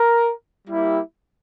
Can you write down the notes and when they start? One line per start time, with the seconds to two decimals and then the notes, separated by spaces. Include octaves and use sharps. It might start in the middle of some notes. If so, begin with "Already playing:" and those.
Already playing: A#4
0.68 G3 A#3 E4 G4